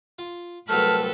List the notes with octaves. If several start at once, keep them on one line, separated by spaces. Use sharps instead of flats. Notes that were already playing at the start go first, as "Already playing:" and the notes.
F4
C2 F#3 A3 A4 B4 A5 F6